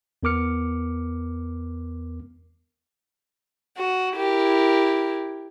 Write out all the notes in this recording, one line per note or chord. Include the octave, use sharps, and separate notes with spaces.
E2 B3 A#4 D6 F6 C#7
F#4
E4 G4 A#4